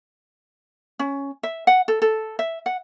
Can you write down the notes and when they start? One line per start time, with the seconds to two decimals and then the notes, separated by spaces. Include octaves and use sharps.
0.99 C#4
1.43 E5
1.67 F#5
1.88 A4
2.02 A4
2.39 E5
2.66 F#5